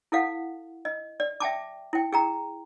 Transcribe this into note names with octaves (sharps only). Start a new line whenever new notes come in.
E4 A4 F5 F#5
D#5
D5
E5 G5 A5 D6
E4 G5
G#4 G5 A#5